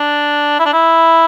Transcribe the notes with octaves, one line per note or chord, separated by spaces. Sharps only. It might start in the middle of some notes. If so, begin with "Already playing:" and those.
Already playing: D4
E4
D4
E4